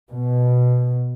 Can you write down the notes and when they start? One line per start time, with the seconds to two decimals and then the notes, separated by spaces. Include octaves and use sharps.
0.11 B2